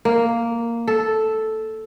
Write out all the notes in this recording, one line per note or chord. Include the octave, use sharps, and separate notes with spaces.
A#3
A4